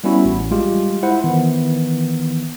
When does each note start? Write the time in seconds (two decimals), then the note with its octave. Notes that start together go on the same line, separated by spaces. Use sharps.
0.04 G3 B3 C#4 E4 F#4
0.25 A1
0.51 G3 G#3 F4 G4
1.03 E4 C5 F#5
1.24 D#3 E3 B3